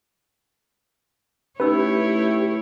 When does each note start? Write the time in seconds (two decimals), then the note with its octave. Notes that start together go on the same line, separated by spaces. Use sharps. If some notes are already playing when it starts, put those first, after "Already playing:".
1.60 A3 C#4 D#4 E4 G4 B4 C#5 E6